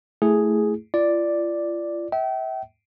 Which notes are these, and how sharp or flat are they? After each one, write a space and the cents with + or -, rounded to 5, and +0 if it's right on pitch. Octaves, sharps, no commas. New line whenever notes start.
A3 +0 E4 +0 G#4 +0
F4 -35 D5 +0
E5 -30 G5 -35